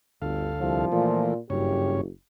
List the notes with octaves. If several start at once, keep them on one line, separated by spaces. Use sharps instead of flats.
G1 D2 A4 F5
C2 F3
A#2 E3 A3 A#3
F#1 G2 C#3 G4 C#5